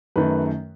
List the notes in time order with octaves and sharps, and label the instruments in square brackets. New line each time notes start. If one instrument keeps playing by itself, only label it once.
[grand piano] F#2 D#3 A3 B4